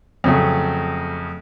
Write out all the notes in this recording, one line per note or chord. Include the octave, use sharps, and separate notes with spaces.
F2 C#3 F#3 A3